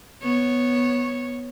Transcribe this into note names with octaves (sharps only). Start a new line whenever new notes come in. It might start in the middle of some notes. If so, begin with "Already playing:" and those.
B3 C#5